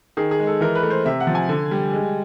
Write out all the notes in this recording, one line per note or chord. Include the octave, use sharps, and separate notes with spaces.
D#3 G#4
G#4
G#3
A4
E3 A#4
B4
A3
C5
C3 E5
F#5
F3
G#5
D3
G3
G#3